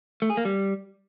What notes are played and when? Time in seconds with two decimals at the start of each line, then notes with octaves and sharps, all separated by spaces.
0.22 A3
0.30 G#4
0.37 A#3
0.45 G3